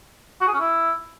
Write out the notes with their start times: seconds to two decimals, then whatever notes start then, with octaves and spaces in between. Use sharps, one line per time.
0.41 F#4
0.47 G#4
0.54 C#4
0.60 E4